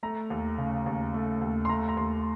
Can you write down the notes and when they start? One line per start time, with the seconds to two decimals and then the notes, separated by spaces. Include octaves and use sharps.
0.03 A3 A#5
0.30 D#2
0.58 C#3
0.86 D#2
1.14 A3
1.42 D#2
1.65 C6
1.69 A3 A#5
1.89 A#5
1.97 D#2 C6